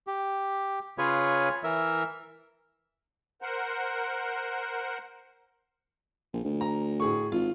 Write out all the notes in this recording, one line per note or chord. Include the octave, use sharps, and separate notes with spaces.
G4
C#3 F4 G#4 B4 C#5 G#5
E3 A#4 E5
A#4 C5 F#5
A#1
D2
A#5
A2 G#4 C#6
G#1 F4